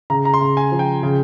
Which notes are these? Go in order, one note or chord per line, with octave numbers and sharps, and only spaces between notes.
C#3 A#5
A#5
C6
C#3
G#5
F3
G5
C#3